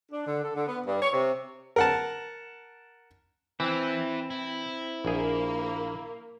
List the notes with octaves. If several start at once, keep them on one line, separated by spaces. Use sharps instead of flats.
D4
D3
A4
D3
B3
G2
C#5
C3
A#4 F#5 A5
E3 C4 E4 B4
E4
A#1 A#3 G#4